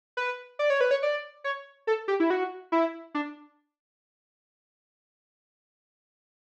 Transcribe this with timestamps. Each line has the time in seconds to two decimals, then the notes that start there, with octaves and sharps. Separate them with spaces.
0.17 B4
0.59 D5
0.70 C#5
0.81 B4
0.91 C#5
1.03 D5
1.44 C#5
1.87 A4
2.08 G4
2.20 E4
2.30 F#4
2.72 E4
3.15 D4